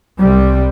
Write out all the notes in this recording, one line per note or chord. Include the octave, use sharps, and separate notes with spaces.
C2 C3 G3